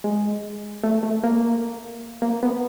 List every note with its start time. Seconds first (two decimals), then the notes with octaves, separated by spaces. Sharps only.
0.04 G#3
0.83 A3
1.03 A3
1.24 A#3
2.22 A#3
2.43 B3